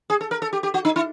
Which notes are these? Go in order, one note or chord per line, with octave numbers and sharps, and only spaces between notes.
G#4
A4
A#4
A4
G4
G4
F#4
D#4
E4